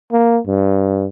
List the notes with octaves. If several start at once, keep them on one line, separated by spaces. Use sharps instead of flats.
A#3
G2